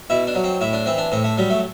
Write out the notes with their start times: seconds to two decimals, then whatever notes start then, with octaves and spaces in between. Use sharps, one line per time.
0.10 B2 E4
0.27 D4
0.35 F#3
0.44 C4
0.61 A2 E4
0.73 D4
0.86 E3 C4
0.98 D4
1.12 A2 C4
1.24 A3
1.38 F#3 G3
1.50 A3